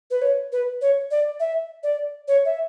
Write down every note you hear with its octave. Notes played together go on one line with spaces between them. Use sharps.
B4
C#5
B4
C#5
D5
E5
D5
C#5
E5